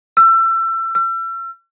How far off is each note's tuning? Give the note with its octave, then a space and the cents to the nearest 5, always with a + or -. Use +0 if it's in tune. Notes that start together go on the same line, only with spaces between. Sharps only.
E6 +30
E6 +40